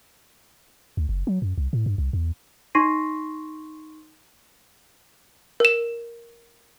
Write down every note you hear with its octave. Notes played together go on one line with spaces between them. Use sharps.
D2
F#1
F#3
F#2
C2
A2
G2
C2
E2
D#4 C6 C#6 A#6 C7 D#7
A#4 E7